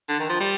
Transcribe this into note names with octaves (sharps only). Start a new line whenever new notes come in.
D3
D#3
F3
G3